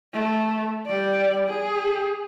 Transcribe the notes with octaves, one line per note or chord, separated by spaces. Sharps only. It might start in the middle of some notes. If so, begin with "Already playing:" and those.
A3
G3 D5
G#4